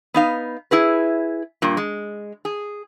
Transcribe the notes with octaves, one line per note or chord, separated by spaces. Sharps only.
B3 D#4 F5
E4 G#4 B4
G2 A#2
G#3
G#4